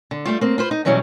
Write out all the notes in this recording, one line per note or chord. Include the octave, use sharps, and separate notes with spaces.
D3
G3 A3 F4
A#3 C4
F4 B4 C5
D#4
B2 E3 F#3 G3 C#4